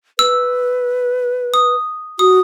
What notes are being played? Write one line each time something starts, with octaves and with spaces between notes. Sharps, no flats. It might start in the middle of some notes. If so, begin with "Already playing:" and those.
B4 E6
D#6
F#4 D#6